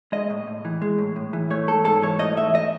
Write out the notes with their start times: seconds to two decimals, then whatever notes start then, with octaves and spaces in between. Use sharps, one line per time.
0.12 G#3 D#5
0.30 A2
0.47 A2
0.65 E3
0.82 G#3
0.98 A2
1.16 A2
1.33 E3
1.50 A3 C#5
1.67 G#2 A4
1.85 G#2 A4
2.03 E3 C#5
2.19 A3 D#5
2.37 G#2 E5
2.55 D#5